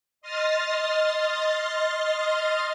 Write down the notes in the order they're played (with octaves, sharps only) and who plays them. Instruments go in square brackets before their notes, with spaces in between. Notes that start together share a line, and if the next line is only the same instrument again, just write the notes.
[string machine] D#5 C6 D#6 F6 A6